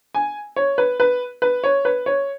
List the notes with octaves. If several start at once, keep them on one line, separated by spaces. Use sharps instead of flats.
G#5
C#5
B4
B4
B4
C#5
B4
C#5